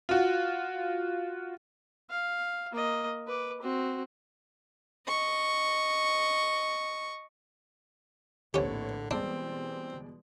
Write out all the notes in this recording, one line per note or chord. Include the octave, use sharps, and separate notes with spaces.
F4 F#4
F5
A#3 D#5
B4 D6
C4 F#4
D#5 C#6
A#1 A2 D3 C4 C#4 G4 B4 C#5
B2 E3 G3 G#3 C4 D4 D5